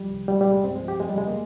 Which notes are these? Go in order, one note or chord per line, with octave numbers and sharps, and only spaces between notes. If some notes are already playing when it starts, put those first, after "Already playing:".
Already playing: C#2 F3 G3
C2
A#2 G3
G3
C2
G#3
G2 C4
G#3
F3
G4
F2 G#3
G3
C#3 G#3
A#3